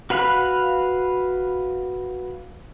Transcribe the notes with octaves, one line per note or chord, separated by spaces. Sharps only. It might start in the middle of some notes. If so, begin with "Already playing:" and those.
F#4 B4 F5 B5 F#6